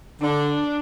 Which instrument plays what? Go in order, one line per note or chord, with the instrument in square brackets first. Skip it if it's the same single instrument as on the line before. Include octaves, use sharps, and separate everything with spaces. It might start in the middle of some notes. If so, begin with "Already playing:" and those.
[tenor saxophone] D3 [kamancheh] D4